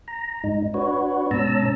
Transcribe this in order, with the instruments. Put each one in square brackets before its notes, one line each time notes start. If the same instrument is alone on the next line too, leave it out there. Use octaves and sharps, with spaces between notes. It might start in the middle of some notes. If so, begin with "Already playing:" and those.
[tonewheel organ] A#5
G#2 D#4
D4 F#4 B4 C#5
G#2 B2 C#4 A5 A#5 E6